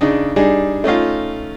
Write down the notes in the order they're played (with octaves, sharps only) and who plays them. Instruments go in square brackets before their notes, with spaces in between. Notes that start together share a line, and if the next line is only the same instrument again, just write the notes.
[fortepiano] C#3 D4 D#4
G3 D4 D#4 G#4
A3 C#4 D#4 F4